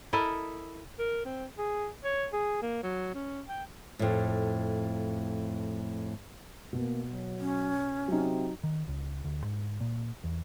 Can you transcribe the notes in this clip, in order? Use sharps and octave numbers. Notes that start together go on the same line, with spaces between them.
E4 A4 A#4 D#5
A#4
C4
G#4
C#5
G#4
A#3
F#3
C#4
G5
F2 A2
B2 A#3
F#3
C#4
C3 F#3 D#4
D#3
C#2
D2
G#2
A#2
E2